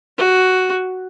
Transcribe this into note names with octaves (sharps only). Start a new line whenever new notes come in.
F#4